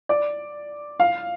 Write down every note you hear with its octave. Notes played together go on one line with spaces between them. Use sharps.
D5
F5